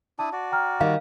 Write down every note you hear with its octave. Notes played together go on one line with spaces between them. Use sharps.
D4 E4 A5 D#6
F#4 D5
G5 A#5 F6
D#3 G3 F5